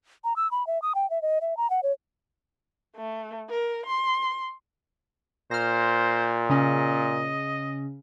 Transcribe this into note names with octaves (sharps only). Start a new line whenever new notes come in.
A#5
E6
B5
E5
D#6
G5
E5
D#5
E5
A#5
F#5
C#5
A3
A#4
C6
A#2 C5 F6 A#6
C#3 C#4 D#5